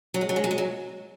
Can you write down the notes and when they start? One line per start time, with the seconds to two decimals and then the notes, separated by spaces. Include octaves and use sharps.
0.14 F#3
0.21 G#3
0.29 F#3
0.36 G#3
0.44 F#3
0.51 G#3
0.58 F#3